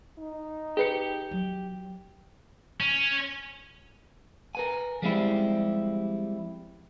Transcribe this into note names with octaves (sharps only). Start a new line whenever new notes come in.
D#4
G4 G#4 B4 C#7
F#3
C#4
A#4 B4 G#5
F3 G3 G#3 C4 E4 G4